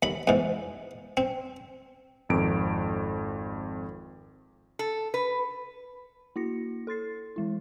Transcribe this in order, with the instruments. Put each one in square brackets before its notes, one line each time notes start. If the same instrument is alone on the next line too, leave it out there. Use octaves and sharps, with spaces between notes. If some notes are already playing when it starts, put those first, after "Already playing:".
[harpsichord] D#2 B5
E2 G#2
C4
[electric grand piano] G#1 F2 D7
[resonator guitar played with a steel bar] A4
B4
[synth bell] A#3 E4 F#4 A#6 C#7
A4 C6 A6 C7
E3 G#3 E4